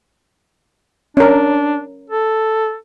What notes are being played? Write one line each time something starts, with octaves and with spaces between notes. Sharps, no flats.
C#4 D4 A#4
A4